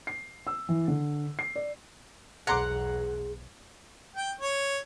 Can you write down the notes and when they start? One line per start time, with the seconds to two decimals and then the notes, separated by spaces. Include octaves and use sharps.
0.07 C7
0.47 E6
0.69 E3
0.88 D3
1.39 C7
1.56 D5
2.47 B1 E2 G#4 F#5 A#5 C6 D6
4.16 G5
4.41 C#5